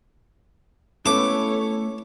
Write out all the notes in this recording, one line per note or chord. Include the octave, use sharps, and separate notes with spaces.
A3 B3 C#4 E4 A4 C#5 D6